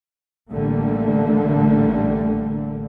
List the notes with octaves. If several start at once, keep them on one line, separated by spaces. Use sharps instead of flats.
A1 D3 G3 A3 A#3